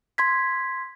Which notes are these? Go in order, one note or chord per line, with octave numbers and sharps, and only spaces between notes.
C6 G#6 B6